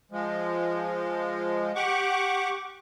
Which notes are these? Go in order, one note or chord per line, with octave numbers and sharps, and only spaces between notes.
F3 G#3
G4 F#5 C#6 D6